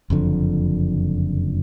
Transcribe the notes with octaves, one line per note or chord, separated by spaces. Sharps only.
F#1 F2 D3 F3